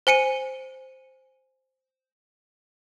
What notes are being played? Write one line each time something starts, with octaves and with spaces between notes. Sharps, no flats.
C5 G#5 C#7 D#7